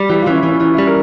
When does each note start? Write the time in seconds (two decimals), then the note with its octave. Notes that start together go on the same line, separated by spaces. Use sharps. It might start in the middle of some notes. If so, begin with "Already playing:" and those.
Already playing: G3
0.10 E3 G4
0.22 F4
0.27 E3 C#4
0.35 E4
0.43 E3 C#4
0.61 E3 C#4
0.74 E4
0.78 G3
0.87 A#4